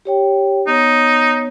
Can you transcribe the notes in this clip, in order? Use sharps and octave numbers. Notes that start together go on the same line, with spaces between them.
G4 C#5 G5
B3 D#4 C#5